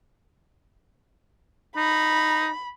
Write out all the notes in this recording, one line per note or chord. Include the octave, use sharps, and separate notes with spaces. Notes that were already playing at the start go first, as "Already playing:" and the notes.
D#4 B5